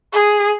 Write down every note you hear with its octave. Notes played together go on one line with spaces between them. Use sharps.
G#4